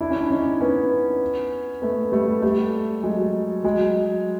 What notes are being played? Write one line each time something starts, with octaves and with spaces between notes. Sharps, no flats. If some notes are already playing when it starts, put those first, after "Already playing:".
D4 E4
C#4
D4
C#4 D#4
B3 C#4
A3 B3
G3 A3
G3 A3
F#3 G#3
F#3 G#3